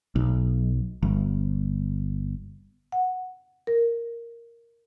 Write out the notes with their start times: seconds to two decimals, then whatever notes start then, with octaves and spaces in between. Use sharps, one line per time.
0.16 B1
1.03 G1
2.92 F#5
3.67 A#4